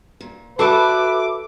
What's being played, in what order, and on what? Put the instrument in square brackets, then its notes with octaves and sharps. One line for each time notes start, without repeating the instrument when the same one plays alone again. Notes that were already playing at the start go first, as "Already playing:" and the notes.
[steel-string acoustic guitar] A#2
[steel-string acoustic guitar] F#4 D5 E5 [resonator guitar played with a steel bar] A4 [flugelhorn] B4 [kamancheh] D6